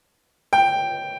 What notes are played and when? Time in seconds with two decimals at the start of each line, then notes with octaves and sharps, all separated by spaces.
0.53 G5